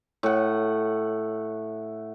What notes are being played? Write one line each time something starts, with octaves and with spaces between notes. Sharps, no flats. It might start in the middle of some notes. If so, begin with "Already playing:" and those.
A2 F#5